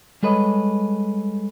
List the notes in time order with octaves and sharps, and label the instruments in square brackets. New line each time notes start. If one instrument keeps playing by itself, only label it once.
[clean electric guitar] G3 G#3 A4 B4 C#5 D#5